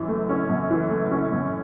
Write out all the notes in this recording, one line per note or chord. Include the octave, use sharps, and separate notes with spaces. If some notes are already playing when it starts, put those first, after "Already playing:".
Already playing: F#2 E3
A3
C#4
F#2
E3
A3
C#4
F#2